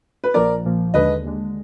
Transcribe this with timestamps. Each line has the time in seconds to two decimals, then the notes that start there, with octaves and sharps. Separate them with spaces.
0.24 B4
0.34 A#1 A#2 F3 A#3 A#4 D5
0.64 A#1 A#2 F3 A#3
0.94 D#2 D3 G#3 D4 B4 D#5
1.24 D#2 D3 G#3 D4